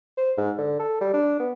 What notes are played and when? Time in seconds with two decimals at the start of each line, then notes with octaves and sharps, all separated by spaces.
0.17 C5
0.37 G#2
0.58 D3
0.79 A4
1.01 G3
1.14 D4
1.40 B3